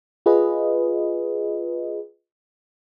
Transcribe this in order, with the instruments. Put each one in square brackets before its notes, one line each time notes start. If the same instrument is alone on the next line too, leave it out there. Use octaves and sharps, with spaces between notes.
[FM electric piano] F4 G#4 B4 D#5